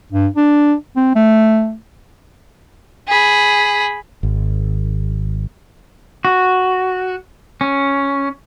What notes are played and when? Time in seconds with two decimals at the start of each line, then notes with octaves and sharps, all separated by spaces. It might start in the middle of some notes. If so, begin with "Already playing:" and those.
0.12 G2
0.36 D4
0.96 C4
1.15 A3
3.07 G#4 B5
4.23 G#1
6.25 F#4
7.61 C#4